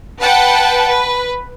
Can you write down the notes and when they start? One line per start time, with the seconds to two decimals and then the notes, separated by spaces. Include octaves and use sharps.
0.20 B4 F#5 G5 A5
0.87 B4